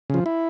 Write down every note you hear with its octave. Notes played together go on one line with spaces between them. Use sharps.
C#3 F3
E4